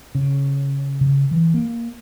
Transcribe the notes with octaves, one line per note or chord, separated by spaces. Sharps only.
C#3
C#3
E3
A#3